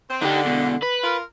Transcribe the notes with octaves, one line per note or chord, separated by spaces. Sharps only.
C4
D3 D#4 G4
E2 B2
B4
F4 A#4